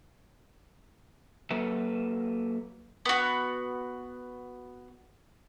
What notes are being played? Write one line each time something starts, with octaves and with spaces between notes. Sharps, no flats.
F#3 A#3 A4 B4 E5
B3 F#4